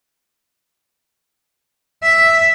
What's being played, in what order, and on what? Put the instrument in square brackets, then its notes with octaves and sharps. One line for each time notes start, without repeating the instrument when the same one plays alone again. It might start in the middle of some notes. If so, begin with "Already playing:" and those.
[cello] E5